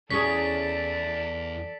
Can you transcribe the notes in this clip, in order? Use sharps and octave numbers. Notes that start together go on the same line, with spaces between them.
E2 C#4 G#4 A4 D5 B6